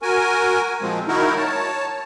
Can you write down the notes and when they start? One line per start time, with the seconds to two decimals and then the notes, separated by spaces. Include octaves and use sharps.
0.02 F#4 A#4 G#5
0.82 A#2 F3 G#3 C4
1.08 D#3 D#4 E4 F#4 A#4
1.37 C#5 A5